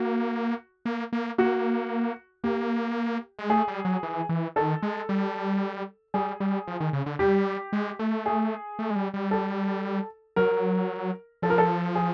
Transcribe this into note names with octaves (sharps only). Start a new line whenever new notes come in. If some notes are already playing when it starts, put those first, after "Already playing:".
Already playing: A#3 F#4
A#3
A#3
A#3 F#4
A#3 G4
G#3
A3 G#4
G3
F#3
E3
E3
D#3 A4
G#3
G3
G3 G#4
G3
F3
D#3
C#3
D3
G3 G4
G#3
A3
G#4
A3
G#3
G3
G3
A4
F#3 A#4
F3 A4
A#4
A4
G#4